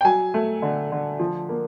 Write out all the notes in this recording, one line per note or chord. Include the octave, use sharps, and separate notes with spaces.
G5
F#3 G#5
A3
D3
D3
F3
A#3